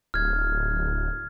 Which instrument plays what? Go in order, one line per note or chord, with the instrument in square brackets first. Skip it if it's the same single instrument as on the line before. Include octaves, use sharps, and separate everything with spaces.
[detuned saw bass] D1 [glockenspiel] F6 G#6